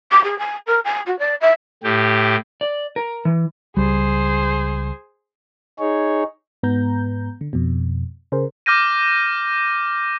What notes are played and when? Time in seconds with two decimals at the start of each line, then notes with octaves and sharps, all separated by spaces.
0.12 D6
0.24 G#4
0.39 G#5
0.67 A#4
0.84 G#5
1.06 F#4
1.19 D5
1.41 E5
1.84 A2 G4
2.61 D5
2.96 A#4
3.25 E3
3.77 C#2 G3 G#4 C5
5.79 D#4 G#4 C#5
6.63 G#2 B3 A#5 G6
7.41 D3
7.53 F2 B2
8.32 C#3 G#4 A#4 C5
8.66 D6 F6 G6 A#6 D#7